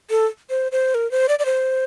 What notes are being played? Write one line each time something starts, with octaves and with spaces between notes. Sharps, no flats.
A4
C5
C5
A#4
C5
D5
D5
C5